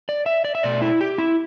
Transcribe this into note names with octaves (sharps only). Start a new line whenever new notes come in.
D5
E5
D5
E5
B2 A3 D5
E4
G4
E4